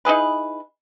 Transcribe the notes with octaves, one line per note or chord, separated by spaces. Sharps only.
D#4 E4 G#4 B4